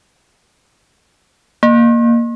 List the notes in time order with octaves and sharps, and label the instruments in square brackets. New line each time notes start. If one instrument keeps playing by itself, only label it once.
[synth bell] A#3